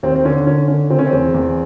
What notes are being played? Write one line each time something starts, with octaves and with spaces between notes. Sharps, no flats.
D#2 C4
C4
D3 C#4
D3 C#4
D3 C#4
C#3 C4
C#4
C4
E2
E2